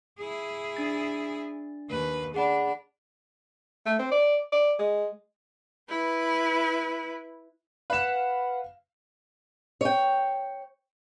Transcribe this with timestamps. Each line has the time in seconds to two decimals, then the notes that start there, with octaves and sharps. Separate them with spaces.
0.18 E4 G#4
0.76 D4 A6
1.90 D#2 B4
2.34 D4 G#4 F#5 B5
3.86 A3
3.99 C4
4.12 D5
4.52 D5
4.79 G#3
5.89 E4 B4
7.90 B4 F5 F#5 E7
9.81 C#5 G5